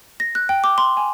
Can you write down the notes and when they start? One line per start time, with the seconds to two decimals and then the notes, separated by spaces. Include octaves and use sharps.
0.20 A#6
0.35 F#6
0.49 G5
0.64 D6
0.78 C6
0.97 G#5